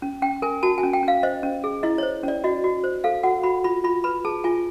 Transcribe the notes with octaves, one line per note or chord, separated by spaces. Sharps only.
C#4
C#4 G5
A#4 G#5
F#4 A5
G#5
C#4
G5
C#4
F5
C5 D#5
C#4
G#4
E4 D#5
C5 C#5
C#4 D5
F#4 D#5
F#4
C5
A4 F5
F#4 F#5
F#4 B5
F4 B5
F4 B5
B4 B5
G#4 A5
F4 G#5